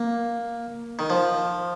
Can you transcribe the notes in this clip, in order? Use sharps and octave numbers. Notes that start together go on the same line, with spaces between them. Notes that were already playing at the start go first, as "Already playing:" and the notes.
Already playing: A#3
D#3
F3